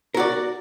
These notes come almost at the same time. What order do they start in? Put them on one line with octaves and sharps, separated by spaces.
A#4 F#4 D5